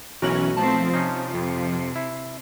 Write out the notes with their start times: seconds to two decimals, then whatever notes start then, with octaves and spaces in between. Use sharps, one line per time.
0.22 B1 E3 C#4 F#4 A#4 C#6 F#7
0.57 F3 A3 C4 A5
0.93 C3 C#4 D#4
1.34 F2
1.96 E4